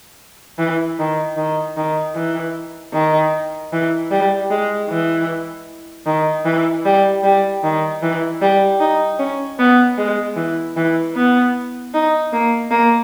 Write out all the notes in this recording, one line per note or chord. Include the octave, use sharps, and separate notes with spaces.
E3
D#3
D#3
D#3
E3
D#3
E3
G3
G#3
E3
D#3
E3
G3
G3
D#3
E3
G3
D#4
C#4
B3
G#3
E3
E3
B3
D#4
A#3
A#3